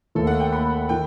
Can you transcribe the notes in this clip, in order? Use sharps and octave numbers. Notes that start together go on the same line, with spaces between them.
D#2 D#3 A3 A4
F#5
G5
B5
D#3 G5